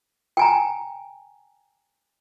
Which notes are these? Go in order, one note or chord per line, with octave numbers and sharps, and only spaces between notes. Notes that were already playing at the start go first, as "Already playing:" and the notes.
G5 G#5 A#5